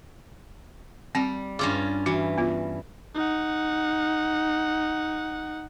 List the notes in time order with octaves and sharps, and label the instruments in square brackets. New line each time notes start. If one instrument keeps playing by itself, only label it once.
[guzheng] G3 [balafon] C4
[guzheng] G2 C#4 F4 [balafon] G#4 D6
[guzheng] E3 [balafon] F#4
[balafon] B3 F4
[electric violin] D#4 F#5